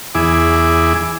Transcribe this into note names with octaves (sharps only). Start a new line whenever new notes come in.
E2 E4 G#4 D6